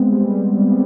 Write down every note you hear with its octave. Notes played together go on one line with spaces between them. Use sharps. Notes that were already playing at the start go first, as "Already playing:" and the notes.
Already playing: G#3 B3 C4
G3
G3